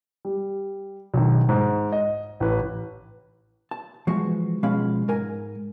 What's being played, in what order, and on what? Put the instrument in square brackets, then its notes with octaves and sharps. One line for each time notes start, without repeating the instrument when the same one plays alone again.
[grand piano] G3
B1 D#3
G#2
D#5
A1 B4
[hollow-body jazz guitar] A5
E3 F3 G#3 B3 F#4
B2 F3 G#3 C#4 F5 B5
G#2 A#4 G#5